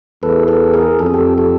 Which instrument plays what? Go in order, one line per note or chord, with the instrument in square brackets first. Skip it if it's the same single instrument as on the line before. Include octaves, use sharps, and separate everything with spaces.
[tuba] E2 [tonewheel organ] A4 B4
[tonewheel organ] A4 B4
G#4 A#4
[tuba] F2 [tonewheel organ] A4
[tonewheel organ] G#4
G4 A4
G4 A4